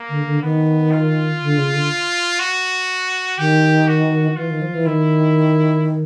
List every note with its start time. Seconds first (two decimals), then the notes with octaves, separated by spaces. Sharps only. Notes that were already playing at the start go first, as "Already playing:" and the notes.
Already playing: A#3
0.09 D3
0.26 D3
0.42 D#3 B3
0.92 F4
1.42 D3
1.57 C#3
1.74 D3
2.39 F#4
3.38 D#3 G4
3.87 F#4
4.37 E3 F4
4.50 D#3
4.62 F3
4.74 E3
4.86 D#3 E4